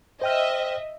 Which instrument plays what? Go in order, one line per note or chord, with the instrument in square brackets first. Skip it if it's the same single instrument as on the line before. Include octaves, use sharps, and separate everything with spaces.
[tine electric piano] C5 G5 F6 [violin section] D#5 E5